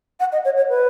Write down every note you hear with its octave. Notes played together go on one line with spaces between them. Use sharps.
F#5
D#5
C#5
C#5
B4